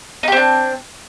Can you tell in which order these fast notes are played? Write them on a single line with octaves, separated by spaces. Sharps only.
D#4 G4 C4 D4